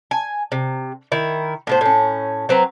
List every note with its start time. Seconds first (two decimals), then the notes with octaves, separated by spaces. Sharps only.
0.11 G#5
0.52 C3
1.12 D#3 E4
1.67 A2 B3 C5
1.81 A2 C#4
2.49 F#3 C4 B4 A#5